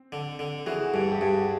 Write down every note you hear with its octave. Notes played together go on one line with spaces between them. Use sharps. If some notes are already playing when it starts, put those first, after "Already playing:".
Already playing: C4
D3
D3
E3 F#4 G#4
G2 A4
G4 A4
G2 F#4 G#4